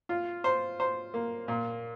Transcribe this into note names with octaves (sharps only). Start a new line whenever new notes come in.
F4
C5
C5
A#3
A#2